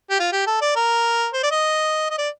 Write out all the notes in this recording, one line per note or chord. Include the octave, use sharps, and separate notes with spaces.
G4
F4
G4
A4
D5
A#4
C5
D5
D#5
D#5
D5